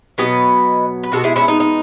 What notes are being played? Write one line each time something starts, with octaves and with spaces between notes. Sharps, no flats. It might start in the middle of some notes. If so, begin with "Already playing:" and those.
B2 F#3 B3 B4 D#5
B4
B2 G#3 B3 F#4 A4
E4 G#4
C#4 E4
D#4
D#4